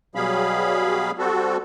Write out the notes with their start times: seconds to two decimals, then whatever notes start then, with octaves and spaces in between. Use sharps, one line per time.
0.15 B2 F#3 G3 G#4 F5 B5
1.18 G3 C4 F#4 A4